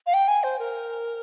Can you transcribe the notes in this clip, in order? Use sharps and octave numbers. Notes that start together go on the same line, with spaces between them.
F5
G5
G#5
C5
A#4